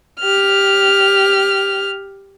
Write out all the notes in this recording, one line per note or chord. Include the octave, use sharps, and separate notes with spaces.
G4 F6